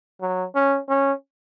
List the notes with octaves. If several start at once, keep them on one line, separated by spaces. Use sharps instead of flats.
F#3
C#4
C#4